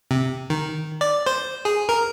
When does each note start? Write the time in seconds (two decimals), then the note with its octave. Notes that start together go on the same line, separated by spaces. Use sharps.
0.11 C3
0.50 D#3
1.01 D5
1.26 C5
1.65 G#4
1.89 A#4